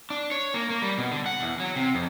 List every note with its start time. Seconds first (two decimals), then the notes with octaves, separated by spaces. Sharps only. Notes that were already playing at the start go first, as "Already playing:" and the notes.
0.10 D4
0.31 C#5
0.54 A#3
0.70 A#3
0.82 G3
0.98 B2
1.12 D3
1.26 F#5
1.41 E2
1.60 F#3
1.76 C3
1.95 F2